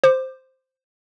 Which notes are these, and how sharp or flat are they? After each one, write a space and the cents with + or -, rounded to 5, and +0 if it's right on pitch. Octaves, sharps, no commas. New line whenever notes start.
C5 +0 D6 +25